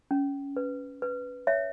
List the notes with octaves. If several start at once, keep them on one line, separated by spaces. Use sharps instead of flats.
C#4
B4
B4
C#5 E5